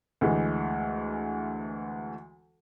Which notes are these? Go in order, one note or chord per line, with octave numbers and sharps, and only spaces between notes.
D2 E3 G#3